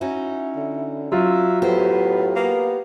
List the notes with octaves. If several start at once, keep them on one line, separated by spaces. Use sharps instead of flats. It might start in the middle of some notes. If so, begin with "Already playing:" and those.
C#4 D#4 E4 F#4
D3
F#3 F4 E5
A2 B3 G4 C5
A#3 B3